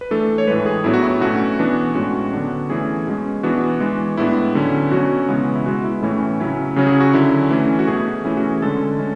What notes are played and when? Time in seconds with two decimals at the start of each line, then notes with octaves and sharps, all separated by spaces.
0.01 B4
0.11 E3 A3 D4 A4
0.38 C#5
0.47 A2 E3 G#3 B4
0.66 G#4
0.84 A2 F#3 B3 D4 E4
0.94 F#4
1.03 E4
1.21 B2 A3 C#4 F#4
1.59 E3 B3 D4
1.95 A2 G#3 C#4 F#4
2.33 D3 F#3 B3 D4
2.70 E3 A3 C#4 G#4
3.07 B2 G#3 C#4
3.43 E3 B3 D4 F#4
3.80 E3 G#3 D4
4.17 A2 G#3 B3 D4 E4
4.55 D3 F#3 C#4
4.91 B2 F#3 C#4 F#4
5.29 C#3 E3 G#3 B3
5.55 E4
5.66 B2 G#3 B3 F#4
5.84 E4
6.02 A2 E3 A3 C#4 E4
6.40 C#3 F#3 C#4 E4
6.76 C#3 F#3 C#4
6.86 G#4
7.00 F#4
7.13 D3 F#3 C#4 E4
7.51 E3 A3 C#4
7.79 F#4
7.87 B2 A3 C#4 G#4
8.25 E3 A3 C#4 E4
8.37 F#4
8.50 G#4
8.62 D3 G#3 C#4 A4
8.99 G#3 C#4